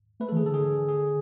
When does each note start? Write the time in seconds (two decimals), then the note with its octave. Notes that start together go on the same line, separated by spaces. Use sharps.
0.20 A3 B4
0.29 A4
0.32 E3 G#4
0.43 D3 A4
0.54 G#4
0.88 G#4